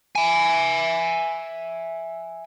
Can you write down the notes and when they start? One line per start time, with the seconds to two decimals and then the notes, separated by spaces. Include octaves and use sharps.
0.16 E5 G#5